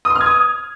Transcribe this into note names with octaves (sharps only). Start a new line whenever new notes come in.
D#6
C6
F6
G#6
D#6